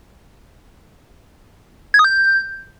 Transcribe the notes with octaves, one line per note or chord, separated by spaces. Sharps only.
G#6
D#6
G6